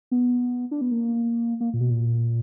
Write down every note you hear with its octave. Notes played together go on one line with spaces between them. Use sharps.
B3
D4
B3
A#3
A#3
A#2
B2
A#2